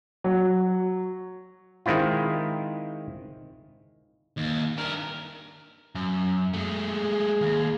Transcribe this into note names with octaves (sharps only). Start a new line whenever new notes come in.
F#3
D#3 G#3 C4 E4 F4
D#2
G2 A#4
F#2
G#3 A3
G#4
D#2